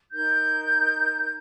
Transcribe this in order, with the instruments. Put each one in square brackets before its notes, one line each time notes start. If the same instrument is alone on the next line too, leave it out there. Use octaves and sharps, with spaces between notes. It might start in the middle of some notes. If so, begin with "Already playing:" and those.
[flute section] D#4 A#4 G6